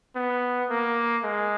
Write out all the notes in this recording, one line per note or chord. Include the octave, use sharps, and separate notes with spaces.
B3
A#3
G#3